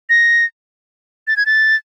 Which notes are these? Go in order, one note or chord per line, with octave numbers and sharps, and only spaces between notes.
A#6
A6
G#6
A6